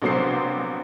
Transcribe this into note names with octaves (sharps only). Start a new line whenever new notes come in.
A#1 C3 F#3 B3 C5 C7